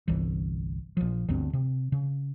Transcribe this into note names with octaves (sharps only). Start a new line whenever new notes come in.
G1 C2 E3
A#1 F3
G1 D2 G2 C4
C3
C#3